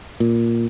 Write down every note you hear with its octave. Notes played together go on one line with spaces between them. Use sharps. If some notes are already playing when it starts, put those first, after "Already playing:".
A#2